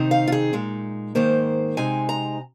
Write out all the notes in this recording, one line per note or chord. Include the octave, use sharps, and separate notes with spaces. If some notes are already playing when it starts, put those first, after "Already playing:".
Already playing: C3 D#3 C4 D#4
F5
F4
G#4
A#2 G#3 D#4
G#2 D#3 A#3 C5
C3 G#3 C4 D#4 G#5
A#5